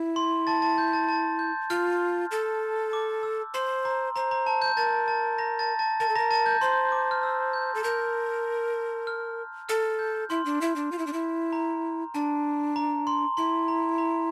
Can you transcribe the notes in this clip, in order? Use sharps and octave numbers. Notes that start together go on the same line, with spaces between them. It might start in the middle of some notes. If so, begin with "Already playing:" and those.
Already playing: E4
C6
A5 A6
A5 A6
G6
A5 A6
A5 A6
G6
F4 F6
A4
D6
E6
C5 C6
A#5
C5 A#5
A#5
A5
G6
A#4 A5 A6
A5 A6
A#5 A#6
A5 A6
A5 A6
A#4 A5 A6
A4
A#4 A#5 A#6
A5 A6
G6
C5 C6
D6
F6
E6
G6
A4
A#4 G6
F6
A4 F6
G6
E4 C6
D4
E4
D4
F4
E4
D4
E4
A#5
D4 A5
A#5
C6
E4 C6
A#5
A#5